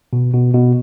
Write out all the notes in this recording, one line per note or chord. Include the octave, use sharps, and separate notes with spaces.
B2
B2
B2